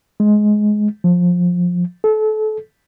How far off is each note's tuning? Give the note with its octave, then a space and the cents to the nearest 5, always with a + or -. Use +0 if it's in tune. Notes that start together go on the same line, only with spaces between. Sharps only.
G#3 +15
F3 +20
A4 -30